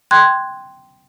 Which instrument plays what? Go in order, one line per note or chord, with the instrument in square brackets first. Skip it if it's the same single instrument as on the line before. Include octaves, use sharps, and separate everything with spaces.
[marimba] G5 C6 F#6 G#6